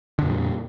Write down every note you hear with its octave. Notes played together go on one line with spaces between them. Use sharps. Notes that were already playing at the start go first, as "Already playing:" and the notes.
F2 A#2 D3 G3